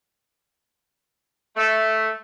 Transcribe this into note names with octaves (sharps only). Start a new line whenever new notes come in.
A3